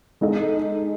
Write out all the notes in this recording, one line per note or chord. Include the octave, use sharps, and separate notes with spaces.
G#3 D#4 A4 D#5